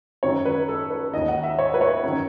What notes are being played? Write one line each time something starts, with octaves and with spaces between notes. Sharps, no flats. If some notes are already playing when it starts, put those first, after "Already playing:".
F#2 D#3 C#5
B4
A4
B4
D#2 D#3 D#5
F#5
E5
C#5
B4
C#5
F#2 D#3